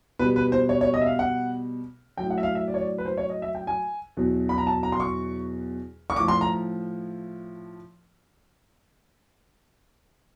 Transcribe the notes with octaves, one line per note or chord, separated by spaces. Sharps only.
B2 G3 B4
B4
C5
C#5
C#5
D#5
E5
F5
F#5
A2 F#3 G5
F#5
E5
F5
E5
D5
C#5
D5
B4
C5
C#5
D#5
E5
G5
G#5
E2 B2 F#3
B5
A#5
A5
A#5
C6
C#6
C#6
A2 F3 D6
C6
A#5